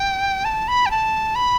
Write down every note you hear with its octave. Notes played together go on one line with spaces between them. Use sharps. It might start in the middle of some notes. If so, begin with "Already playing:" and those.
Already playing: G5
A5
B5
G5
A5
B5